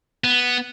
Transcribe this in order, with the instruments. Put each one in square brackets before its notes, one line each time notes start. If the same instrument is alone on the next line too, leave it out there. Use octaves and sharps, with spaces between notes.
[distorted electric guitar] B3